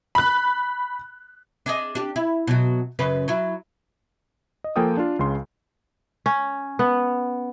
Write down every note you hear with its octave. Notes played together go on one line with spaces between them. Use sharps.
B5 F#6
D4 G#4 D#5
D4 G4
E4
B2 F#3 F#4
F#2 C#3 B4
F#3 E4
D#5
F3 A#3 A4 G5 G#5 D#6
D4 F4
C#2 C#3 C6
C#4
B3